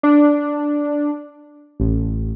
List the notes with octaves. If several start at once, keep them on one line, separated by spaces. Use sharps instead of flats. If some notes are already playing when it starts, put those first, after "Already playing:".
D4
A1